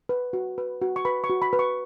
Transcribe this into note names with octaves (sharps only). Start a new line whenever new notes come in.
B4
F#4
B4
F#4
C#6
B4 B5
C#6
F#4
B5
B4
C#6